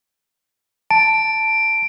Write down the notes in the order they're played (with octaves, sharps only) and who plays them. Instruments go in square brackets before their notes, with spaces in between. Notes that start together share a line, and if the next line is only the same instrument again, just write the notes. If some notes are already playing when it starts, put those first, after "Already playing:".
[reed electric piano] A5 [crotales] D7